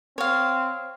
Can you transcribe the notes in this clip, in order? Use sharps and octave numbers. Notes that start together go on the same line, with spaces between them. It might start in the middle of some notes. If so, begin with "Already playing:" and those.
C4 C#5 F5